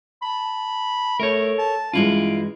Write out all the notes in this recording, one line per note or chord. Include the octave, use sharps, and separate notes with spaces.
A5 B5
A3 A4 A#4 C#5
A5
G2 E3 G#3 C#4 E4 F4 D7